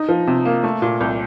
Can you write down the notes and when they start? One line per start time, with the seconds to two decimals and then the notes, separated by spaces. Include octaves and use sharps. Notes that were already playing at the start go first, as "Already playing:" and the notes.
Already playing: D#4
0.09 F3
0.27 C3
0.45 A#3
0.63 A3
0.82 A#2
1.01 C2